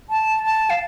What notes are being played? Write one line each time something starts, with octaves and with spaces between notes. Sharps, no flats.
A5
A5
F5